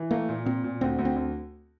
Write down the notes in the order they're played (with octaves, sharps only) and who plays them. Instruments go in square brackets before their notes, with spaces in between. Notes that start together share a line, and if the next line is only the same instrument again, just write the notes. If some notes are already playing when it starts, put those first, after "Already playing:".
Already playing: [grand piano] E3
[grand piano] A3 [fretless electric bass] A#3
[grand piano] A#2
[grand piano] A#2 [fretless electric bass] C4
[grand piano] A#2
[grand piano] D2 [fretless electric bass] C4
[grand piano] D2
[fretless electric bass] C4
[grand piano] D2